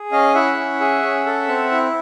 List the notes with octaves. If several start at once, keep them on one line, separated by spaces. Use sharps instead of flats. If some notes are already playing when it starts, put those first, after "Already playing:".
Already playing: G#4
C#4 D#5 F5
E4 E5 F#5
C#4
G#4
C#4
A4
C4
E4